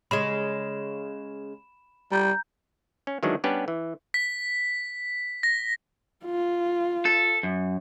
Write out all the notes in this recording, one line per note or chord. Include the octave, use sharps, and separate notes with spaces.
C#3 G#3 B5 E7
G3 A#5 G6
C#4
D#3 E3 F#3 G#3 C#4 D4
G3 B3 C#4 D4 G4 B4
E3
B6
A#6
F4
A4
F#2